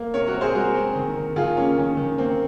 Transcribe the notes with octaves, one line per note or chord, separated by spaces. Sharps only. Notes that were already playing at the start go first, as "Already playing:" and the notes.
Already playing: A#3
C3 A#4 C#5
F#4 A#4
C4
G#4 C5
G#3 F#4 A#4
C4
D#3
D#3
D#3 F4 G#4
A#3 C#4
D#3 C#4
D#3
A#3 C4